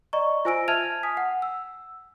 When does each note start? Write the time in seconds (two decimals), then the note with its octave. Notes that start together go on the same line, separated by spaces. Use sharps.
0.13 D5 D#5 A#5 C#6
0.45 F4 C5 G#5 E6 A#6 D7
0.68 E5 A5 F6 G#6 D#7 F7
1.03 G#5 D#6 B6
1.17 F#5
1.42 E6